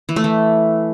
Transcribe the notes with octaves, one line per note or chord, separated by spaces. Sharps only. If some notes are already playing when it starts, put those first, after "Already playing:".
E3
A3
E3